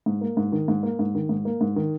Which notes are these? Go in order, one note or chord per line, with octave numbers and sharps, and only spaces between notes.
G#2
A#3
G#2
D#3
G#2
A#3
G#2
D#3
G#2
A#3
G#2
D#3